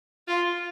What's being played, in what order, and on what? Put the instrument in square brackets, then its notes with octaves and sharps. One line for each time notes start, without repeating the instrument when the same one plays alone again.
[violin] F4